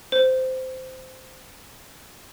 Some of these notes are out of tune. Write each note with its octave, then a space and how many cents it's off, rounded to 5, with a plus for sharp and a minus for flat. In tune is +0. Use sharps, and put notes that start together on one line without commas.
C5 -15